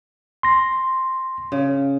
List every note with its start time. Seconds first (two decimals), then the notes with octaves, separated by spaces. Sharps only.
0.43 C6 A#6
1.52 C#3